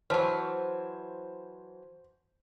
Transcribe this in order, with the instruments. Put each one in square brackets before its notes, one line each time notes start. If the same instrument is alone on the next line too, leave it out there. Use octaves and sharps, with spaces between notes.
[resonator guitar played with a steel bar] E3 F#3 [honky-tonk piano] C5 [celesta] A5 F6